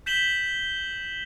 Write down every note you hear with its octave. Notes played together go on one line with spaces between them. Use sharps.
G6 B6 E7 F#7 G7